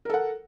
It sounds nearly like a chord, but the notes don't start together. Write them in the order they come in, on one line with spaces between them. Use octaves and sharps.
A#4 A4 F#5